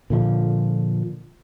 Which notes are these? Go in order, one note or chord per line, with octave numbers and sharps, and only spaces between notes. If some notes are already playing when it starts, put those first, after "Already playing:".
A#2 D3 F3